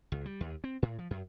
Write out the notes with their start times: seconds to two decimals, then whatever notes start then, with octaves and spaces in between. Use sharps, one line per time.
0.12 C#2
0.26 G3
0.40 D#2
0.64 C4
0.82 A2
0.99 F3
1.11 F#2